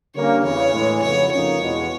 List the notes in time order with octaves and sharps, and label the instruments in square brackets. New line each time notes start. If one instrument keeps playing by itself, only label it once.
[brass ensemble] D3 G3 A#3 C#4 [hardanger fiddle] C#5
[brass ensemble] E2 C#3 E3 [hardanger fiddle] C#5
[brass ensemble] A2 E3 G#3
[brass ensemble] F2 C#3 F#3 B3 [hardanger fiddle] C#5
[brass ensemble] F2 C#3 F3 A#3 D#4 [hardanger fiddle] C#5
[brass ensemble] E2 B2 G#3